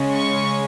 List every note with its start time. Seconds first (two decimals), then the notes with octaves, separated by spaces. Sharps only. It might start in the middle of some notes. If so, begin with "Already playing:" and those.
Already playing: C#3 G#3 C#4
0.14 C#6